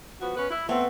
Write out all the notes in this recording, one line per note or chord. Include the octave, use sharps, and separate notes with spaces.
F3 B3 F#4
B3 C#4 B4
E4
A3 B3 C4